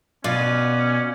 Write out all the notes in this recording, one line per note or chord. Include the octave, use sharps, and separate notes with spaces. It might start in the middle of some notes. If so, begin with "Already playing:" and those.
B2 C#4 F4 B4 D5